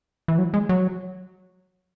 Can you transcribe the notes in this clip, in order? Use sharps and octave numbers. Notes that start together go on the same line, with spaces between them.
E3
F#3
G#3
F#3